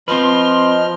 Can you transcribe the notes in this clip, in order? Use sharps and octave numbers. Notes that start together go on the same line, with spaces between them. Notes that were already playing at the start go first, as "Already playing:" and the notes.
F3 C4 B4 D#5 C6 F6